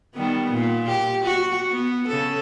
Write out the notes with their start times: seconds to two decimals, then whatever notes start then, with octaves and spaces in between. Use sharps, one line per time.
0.15 D#3 G3 B3
0.51 A#2
0.87 G4
1.24 F#4
1.72 B3
2.08 C#3 A4